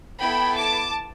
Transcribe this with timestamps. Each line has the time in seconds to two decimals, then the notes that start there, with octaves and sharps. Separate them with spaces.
0.20 B3 E4 A4 G5 B5
0.57 A5 D6